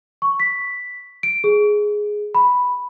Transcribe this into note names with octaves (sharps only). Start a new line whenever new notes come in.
C#6
B6
D7
G#4
B5